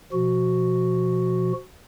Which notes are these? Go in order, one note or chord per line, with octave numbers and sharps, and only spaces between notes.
B2 F3 F#4